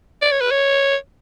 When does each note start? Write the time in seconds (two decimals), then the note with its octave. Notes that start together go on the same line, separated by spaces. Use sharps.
0.22 D5
0.32 C#5
0.41 B4
0.51 C#5